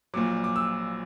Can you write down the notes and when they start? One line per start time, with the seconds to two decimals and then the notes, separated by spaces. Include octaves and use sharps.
0.14 A#1 A#2 F#3 D6
0.44 D6
0.56 E6